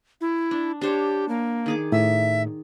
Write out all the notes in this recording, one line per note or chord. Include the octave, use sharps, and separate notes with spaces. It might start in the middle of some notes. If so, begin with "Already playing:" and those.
E4
D4
D4 G4 C5 C#5
A#3
D#3 G#4 D6
A2 E5